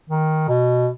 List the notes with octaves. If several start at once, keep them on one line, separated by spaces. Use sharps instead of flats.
D#3
B2